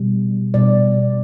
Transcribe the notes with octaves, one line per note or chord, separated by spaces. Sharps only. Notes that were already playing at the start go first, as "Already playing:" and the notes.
Already playing: B2 G3
B2 G3 D5